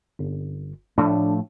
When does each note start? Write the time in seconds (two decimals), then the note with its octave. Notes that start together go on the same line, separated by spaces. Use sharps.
0.19 G1
0.98 A2 F3 A3 D4